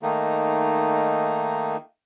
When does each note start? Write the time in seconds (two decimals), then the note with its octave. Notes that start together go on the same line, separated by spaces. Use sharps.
0.03 D#3 A3 A#3 D#4